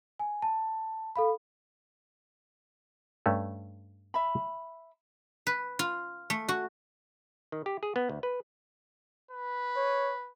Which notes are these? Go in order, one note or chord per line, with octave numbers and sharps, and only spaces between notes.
G#5
A5
A4 F5 B5
G2 A3 C#4
E5 B5
B4
F4
A3
F#4
D#3
G4
G#4
B3
D2
B4
B4
C#5